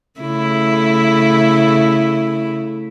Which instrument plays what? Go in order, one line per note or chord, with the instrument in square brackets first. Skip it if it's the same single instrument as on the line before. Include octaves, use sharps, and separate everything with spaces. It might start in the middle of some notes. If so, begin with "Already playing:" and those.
[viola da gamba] C#3 A3 E4